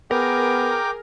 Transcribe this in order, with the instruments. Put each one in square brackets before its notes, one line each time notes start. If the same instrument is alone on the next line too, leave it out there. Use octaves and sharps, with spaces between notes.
[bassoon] B3 [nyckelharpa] G#4 [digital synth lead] A#4 [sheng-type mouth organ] G5 D6